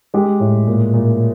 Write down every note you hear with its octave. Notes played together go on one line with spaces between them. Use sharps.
G#3 G4
A2
A#2
A#2